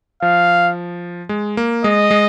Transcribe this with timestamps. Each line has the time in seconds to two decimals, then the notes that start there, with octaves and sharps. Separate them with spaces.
0.22 F3 F5
1.29 G#3
1.57 A#3
1.84 G#3 D#5
2.11 G#3